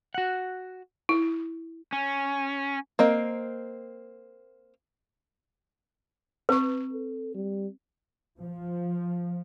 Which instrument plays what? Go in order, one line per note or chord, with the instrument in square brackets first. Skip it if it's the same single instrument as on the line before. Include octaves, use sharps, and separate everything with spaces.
[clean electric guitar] F#4 F#5
[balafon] E4
[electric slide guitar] C#4
[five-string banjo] A#3 C4 D#5
[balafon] C4 C#6 [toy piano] B4
[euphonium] A4
G3
[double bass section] F3